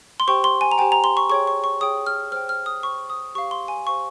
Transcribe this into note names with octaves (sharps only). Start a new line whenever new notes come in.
C6
G4 C5 G5 C#6
C6
G#5
A#5
G4 C5 G5 G#5
A#5
C6
C#6
G#4 C#5 G5 C#6
C#6
C#6
G#4 C#5 G5 D#6
F6
C5 G5 F6
F6
D#6
C5 G5 C#6
D#6
G4 C5 F5 C#6
C6
G#5
G4 C5 F5 C#6